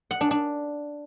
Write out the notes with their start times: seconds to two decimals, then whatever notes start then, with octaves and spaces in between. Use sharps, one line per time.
0.11 F#5
0.21 D4
0.31 D4